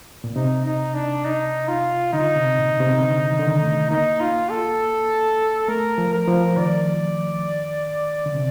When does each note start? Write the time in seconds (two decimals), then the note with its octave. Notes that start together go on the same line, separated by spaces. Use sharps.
0.24 A#2
0.36 C3 D#4
0.65 D#4
0.94 D4
1.25 D#4
1.68 F4
2.13 D3 D#4
2.36 C3
2.58 A#2
2.80 C3
3.01 D3
3.31 D#3
3.39 D3
3.48 D#3
3.61 A3
3.90 A#3 D#4
4.21 F4
4.50 A4
5.68 A3 A#4
5.98 F3
6.13 A#4
6.27 F3
6.57 D#3 D5
8.26 D3
8.35 C3